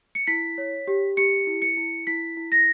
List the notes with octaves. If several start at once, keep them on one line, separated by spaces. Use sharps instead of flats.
C#7
E4 B6
C#5
G4
G4 C#7
E4
C#7
E4
E4 B6
E4
A#6